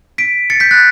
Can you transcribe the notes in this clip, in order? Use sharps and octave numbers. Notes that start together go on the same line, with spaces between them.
B6 D7
A6 C#7
G6 B6
F#6 A6